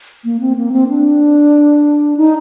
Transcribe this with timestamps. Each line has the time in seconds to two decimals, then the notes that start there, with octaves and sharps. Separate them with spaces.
0.24 A#3
0.40 C4
0.56 A#3
0.72 C4
0.88 D4
2.17 D#4